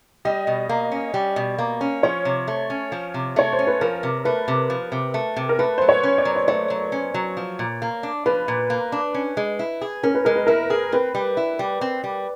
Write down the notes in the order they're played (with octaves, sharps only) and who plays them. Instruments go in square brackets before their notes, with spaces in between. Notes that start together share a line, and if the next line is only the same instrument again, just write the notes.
[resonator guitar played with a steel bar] G3 [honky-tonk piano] D#5
[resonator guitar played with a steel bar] B2
A#3
C#4
G3
B2
A#3
C#4
[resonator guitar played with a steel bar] F3 [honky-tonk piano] C#5
[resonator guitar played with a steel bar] C3
A3
C#4
F3
C3
[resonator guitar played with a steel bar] A3 [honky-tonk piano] C#5
[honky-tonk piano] C5
[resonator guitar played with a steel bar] C#4
[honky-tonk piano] B4
[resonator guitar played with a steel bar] F3 [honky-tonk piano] A#4
[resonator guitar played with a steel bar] C3
[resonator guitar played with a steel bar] A3 [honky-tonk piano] B4
[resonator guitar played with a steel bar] C3
F3
C3
A3
C3
[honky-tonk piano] A#4
[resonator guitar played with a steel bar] A3 [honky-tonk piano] B4
[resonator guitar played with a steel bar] F#3 [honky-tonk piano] C5
[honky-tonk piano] C#5
[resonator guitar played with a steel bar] C#4
[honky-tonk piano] D5
[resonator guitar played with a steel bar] F#3
[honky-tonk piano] D5
[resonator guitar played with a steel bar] A3 [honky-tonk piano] C#5
[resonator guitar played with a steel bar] F#3
C#4
F#3
F3
A#2
A#3
D4
[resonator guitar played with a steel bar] F3 [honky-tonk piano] B4
[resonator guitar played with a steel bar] A#2
A#3
D4
C#4
G#3
E4
G#4
[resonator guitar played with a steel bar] C#4 [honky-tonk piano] A#4
[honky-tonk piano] B4
[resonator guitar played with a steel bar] G#3 [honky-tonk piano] A#4
[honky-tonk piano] B4
[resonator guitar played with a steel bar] E4 [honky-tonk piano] A#4
[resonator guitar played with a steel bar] G#4
[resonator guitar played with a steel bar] C4 [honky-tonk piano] B4
[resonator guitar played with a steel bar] G3
E4
G3
C4
G3